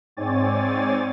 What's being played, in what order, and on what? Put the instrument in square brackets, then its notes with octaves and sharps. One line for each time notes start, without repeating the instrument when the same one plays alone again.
[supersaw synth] G#2 C4 C#5 D5 G#5 A6